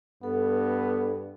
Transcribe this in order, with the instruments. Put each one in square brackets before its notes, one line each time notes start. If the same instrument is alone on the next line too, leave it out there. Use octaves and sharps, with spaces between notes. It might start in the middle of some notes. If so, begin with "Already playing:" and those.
[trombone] G2 [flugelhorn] B3 [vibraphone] A4